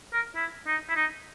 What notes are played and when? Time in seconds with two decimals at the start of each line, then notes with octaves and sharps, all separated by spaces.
0.13 A#4
0.35 E4
0.67 D#4
0.89 E4
0.96 D#4